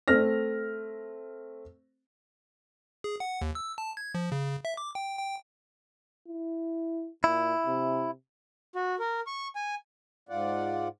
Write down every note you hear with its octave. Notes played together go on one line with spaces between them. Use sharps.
A3 C4 F6 A#6
G#4
F#5
D#2
E6
A5
G#6
F3
C#3
E5
D6
G5
G5
E4
A#2 E4
C3
F#4
A#4
C#6
G#5
G#2 F4 D5 F#5